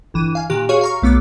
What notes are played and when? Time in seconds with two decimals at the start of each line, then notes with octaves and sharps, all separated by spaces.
0.14 G1 E3 D#7
0.35 F5 G#5
0.50 A#2 D#3 G4 F#6
0.69 F#4 G#4 C#5 F5 C#6
0.81 F5 A#5 C#6
1.02 B1 A3 B3 D6